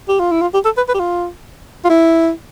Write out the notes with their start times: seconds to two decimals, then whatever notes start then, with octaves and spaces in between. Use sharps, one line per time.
0.08 G4
0.19 F4
0.32 E4
0.42 F4
0.54 G4
0.65 A4
0.77 B4
0.89 B4
0.94 G4
0.99 F4
1.85 F4
1.90 E4